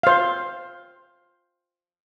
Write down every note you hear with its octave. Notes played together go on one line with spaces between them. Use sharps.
C5 F5